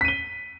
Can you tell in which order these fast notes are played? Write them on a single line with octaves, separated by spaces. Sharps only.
B6 D#7 G7